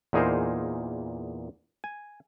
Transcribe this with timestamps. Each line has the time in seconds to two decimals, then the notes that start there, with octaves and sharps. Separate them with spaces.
0.13 E2 A#2 D#4 G#4 A#4 C5
1.84 G#5